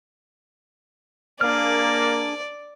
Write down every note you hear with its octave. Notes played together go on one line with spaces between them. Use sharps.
A#3 D4 G#4 D5 F6